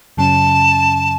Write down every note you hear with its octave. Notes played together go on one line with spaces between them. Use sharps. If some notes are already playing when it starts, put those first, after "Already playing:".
F#2 C#3 F#3 C#4 A5